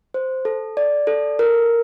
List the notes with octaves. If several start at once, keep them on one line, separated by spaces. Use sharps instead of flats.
C5
A4
D5
A4
A#4